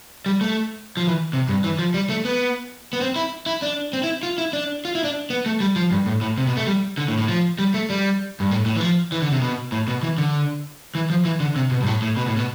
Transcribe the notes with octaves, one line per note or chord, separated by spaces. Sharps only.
G3
A3
F3
E3
C3
G2
E3
F3
G3
A3
B3
B3
C4
E4
E4
D4
C4
E4
F4
E4
D4
F4
E4
D4
B3
A3
G3
F3
G2
A2
A2
C3
B2
A3
G3
D3
A2
A2
F3
G3
A3
G3
G2
A2
A2
E3
F3
E3
D3
C3
B2
A2
B2
E3
D3
E3
F3
E3
D3
C3
B2
G2
A2
A2
B2
A2
B2